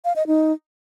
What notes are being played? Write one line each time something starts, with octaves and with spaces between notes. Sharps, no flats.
F5
D#5
D#4